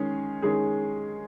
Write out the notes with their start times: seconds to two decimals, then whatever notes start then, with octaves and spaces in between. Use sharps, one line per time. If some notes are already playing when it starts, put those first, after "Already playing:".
Already playing: D#3 G#3 C#4 G#4
0.42 D#3 G#3 C#4 G#4